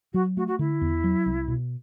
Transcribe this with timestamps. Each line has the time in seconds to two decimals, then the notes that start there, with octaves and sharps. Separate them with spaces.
0.14 F#3 F#4
0.37 A3 F#4
0.47 F#4
0.59 D3 E4
0.81 E2
1.04 F#3
1.26 C2
1.48 B2